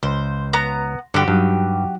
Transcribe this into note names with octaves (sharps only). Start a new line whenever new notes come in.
C#2 C5 C6
B3 A#5
G2 D3 F#4 G4 C#7
G2 F#3 D#4 D#6